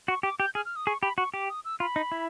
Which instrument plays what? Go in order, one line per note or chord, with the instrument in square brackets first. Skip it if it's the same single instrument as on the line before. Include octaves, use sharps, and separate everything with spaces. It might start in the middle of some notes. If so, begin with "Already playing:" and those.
[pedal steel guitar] F#4 [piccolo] C#6
[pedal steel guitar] G4 [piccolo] D6
[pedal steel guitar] G4 [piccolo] G6
[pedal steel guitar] G#4 [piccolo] F6
[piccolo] F6
D#6
[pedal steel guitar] G#4 [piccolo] C#6
[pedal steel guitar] G4 [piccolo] B5
[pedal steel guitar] F#4 [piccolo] C#6
[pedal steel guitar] G4 [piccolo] D6
[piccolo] D#6
E6
[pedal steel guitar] F4 [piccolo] B5
[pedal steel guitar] D#4
E4